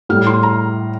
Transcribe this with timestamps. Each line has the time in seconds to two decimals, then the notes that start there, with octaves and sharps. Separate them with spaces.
0.09 A2 G3 F6
0.27 C6
0.43 A#5